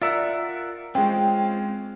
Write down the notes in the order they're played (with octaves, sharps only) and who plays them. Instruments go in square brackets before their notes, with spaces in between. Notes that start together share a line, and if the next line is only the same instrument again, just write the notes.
[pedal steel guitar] F4 A#4 F#5 [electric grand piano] D5 E5 E6
[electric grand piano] G#3 C#4 [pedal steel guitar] C4 F4 [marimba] G5